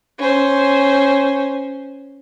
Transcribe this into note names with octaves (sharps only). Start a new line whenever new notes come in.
C#4 C5